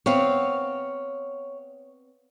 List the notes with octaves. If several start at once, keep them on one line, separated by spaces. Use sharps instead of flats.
B3 C4 C#5 F5